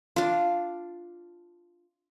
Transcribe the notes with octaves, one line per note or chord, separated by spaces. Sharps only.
D4 F4